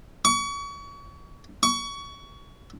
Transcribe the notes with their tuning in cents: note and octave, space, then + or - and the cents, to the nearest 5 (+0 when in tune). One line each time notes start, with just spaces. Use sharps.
C#6 +35
C#6 +25